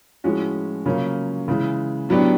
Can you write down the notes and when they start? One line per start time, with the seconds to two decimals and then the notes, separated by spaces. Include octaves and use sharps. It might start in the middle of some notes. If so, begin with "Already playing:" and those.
0.24 A2 F3 G#3 C#4 F#4
0.85 C#3 F#3 A#3 C#4 F4
1.48 C#3 E3 G#3
2.09 A2 F#3 B3 D4 G4